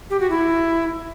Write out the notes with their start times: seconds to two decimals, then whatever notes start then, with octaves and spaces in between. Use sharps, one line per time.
0.10 G4
0.20 F#4
0.30 E4